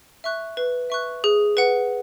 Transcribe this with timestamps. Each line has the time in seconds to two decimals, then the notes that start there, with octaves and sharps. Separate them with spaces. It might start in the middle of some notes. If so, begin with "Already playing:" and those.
0.24 E5 C#6 F#6
0.57 B4
0.90 E5 C#6 F#6
1.24 G#4
1.57 B4 F#5